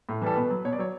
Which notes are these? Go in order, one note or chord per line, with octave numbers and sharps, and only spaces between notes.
A2
E3 G3 A4
B2 B4
F#3
B2 C#5
D5
F#3 C#5